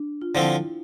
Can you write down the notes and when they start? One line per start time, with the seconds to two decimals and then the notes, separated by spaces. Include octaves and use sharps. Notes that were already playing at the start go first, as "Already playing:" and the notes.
Already playing: D4
0.22 F4
0.34 D3 F3 C4 E4